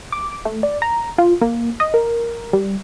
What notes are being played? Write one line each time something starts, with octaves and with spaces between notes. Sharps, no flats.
D6
A3
D5
A#5
F4
A#3
D#5
A#4
G3